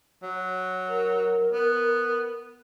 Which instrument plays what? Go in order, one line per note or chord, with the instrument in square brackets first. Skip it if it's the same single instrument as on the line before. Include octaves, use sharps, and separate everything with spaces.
[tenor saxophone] F#3
[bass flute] A#4
[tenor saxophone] B3